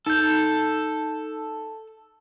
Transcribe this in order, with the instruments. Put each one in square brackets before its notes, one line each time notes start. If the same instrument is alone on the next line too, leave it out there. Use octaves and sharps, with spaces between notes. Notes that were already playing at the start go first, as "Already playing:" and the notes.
[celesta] D#4 G6 [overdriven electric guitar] A4